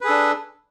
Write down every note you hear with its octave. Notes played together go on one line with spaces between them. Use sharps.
D4 G#4 A4 B4